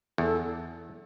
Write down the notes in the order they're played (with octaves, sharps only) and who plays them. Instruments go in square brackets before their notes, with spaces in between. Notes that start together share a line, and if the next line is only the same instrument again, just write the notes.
[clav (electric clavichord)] E2 [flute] A4